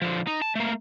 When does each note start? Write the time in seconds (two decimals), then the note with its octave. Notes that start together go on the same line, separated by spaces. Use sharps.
0.02 D3 F3
0.27 D#4
0.42 A5
0.55 A3 A#3